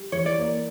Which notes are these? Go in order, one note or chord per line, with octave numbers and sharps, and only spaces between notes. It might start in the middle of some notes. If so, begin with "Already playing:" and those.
Already playing: G3
E3 C#5
D5
A#3